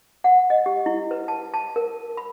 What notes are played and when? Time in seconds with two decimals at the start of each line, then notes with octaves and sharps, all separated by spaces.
0.24 F#5
0.50 D#5
0.66 G4
0.86 E4
1.11 B4
1.28 A5
1.54 A5
1.76 A#4
2.17 B5